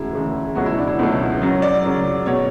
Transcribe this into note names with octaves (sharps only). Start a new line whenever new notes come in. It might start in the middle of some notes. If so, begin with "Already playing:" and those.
Already playing: E1 D2 C#3 G#3 E4
E1 D2 C#3 G#3
C#2 B2 F#3 A3 F#4
E4
D4
E4
C#2 B2 F#3 A3
F#2 C#3 F#3
D5
F#2 C#3 F#3
B2 C#5